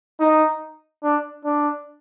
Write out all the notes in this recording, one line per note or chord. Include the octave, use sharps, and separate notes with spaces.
D#4
D4
D4